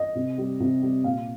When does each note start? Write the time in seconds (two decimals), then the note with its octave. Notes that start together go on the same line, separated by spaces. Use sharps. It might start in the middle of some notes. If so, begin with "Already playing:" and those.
Already playing: D#5
0.15 C3
0.38 G3
0.60 C3
0.82 G3
1.04 A#2 F5